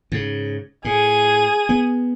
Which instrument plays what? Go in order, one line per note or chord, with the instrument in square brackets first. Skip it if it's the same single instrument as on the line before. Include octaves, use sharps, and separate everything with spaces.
[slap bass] G#2 C#3
[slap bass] A2 [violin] G#4 D#7
[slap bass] B3